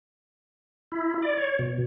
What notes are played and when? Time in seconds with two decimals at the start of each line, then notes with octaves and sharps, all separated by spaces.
0.92 E4
1.22 D5
1.37 C#5
1.59 B2